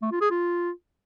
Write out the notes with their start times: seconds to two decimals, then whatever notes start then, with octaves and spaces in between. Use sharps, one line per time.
0.02 A3
0.12 F4
0.21 G#4
0.31 F4